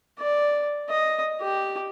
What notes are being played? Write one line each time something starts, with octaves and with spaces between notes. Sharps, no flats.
D5
D#5
G4